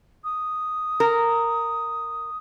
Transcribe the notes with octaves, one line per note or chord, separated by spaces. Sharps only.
D#6
A#4